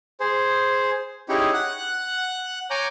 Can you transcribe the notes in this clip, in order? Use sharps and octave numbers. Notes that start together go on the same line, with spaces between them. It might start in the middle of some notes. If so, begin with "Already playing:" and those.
G#4 C5
C#4 D#4 E4 G4 G#4 C#5
F#5 F#6
C#5 G#5 A#5 D6 G6